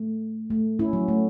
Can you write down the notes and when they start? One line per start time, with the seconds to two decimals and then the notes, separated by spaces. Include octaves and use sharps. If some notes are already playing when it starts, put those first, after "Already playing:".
Already playing: A3
0.50 A3
0.79 C#4 E4
0.93 F#3
1.08 A3